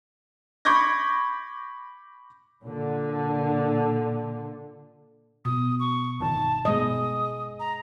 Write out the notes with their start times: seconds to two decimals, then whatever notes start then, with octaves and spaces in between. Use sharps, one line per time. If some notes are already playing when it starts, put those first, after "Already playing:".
0.65 B5 C#6 D6 G6 G#6 A#6
2.63 A#2 D3
5.45 B2 D#6
5.80 C#6
6.20 G1 D3 D#3 A5
6.65 G1 B2 G#3 D#5 D#6
7.60 A#5